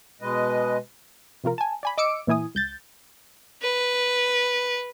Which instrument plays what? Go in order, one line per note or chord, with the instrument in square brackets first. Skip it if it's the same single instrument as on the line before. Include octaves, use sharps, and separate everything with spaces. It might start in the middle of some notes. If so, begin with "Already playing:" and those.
[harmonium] B2 G#3 B4 D#5
[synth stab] C3 F3 F4 A#4
G#5 A5
D5 G#5 B5
D#5 D6 E6 C#7 D7
A#2 E3 E4 G#5 D#6
C#2 G6 A6
[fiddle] B4